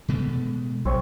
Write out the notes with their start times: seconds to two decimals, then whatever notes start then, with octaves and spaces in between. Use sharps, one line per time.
0.08 B2 G#3 A3
0.85 B1 C4 C#5